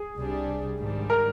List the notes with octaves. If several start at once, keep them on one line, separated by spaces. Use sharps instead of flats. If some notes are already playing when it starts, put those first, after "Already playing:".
Already playing: G#4
C2 C3 G3 D4
G#2 D#3 G3 D4
A#4